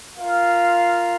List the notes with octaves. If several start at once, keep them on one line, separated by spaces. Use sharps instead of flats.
F4 A#4 F5